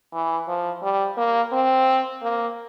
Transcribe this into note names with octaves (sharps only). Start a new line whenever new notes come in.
E3
F3
G3
A#3
C4
A#3